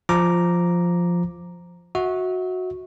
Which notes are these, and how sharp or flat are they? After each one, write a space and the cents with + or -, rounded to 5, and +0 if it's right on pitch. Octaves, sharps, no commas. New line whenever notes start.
F3 +0 A#5 +0 D6 +0
F#4 -10 E5 -35